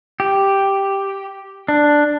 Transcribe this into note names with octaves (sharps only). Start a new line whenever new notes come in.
G4
D4